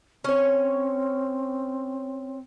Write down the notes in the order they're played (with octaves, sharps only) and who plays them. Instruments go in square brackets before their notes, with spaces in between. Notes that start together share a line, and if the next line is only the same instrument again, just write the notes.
[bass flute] C4 [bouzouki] C#4 C#5